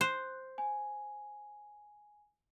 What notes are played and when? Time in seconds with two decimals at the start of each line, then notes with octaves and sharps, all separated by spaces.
0.01 C5 F#6
0.58 G#5